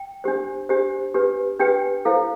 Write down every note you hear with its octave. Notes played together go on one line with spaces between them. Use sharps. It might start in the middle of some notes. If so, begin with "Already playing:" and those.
Already playing: G5
D4 G4 C5
D4 G4 C5
D4 G4 B4
D4 G4 B4 G5
E4 A4 C5 F5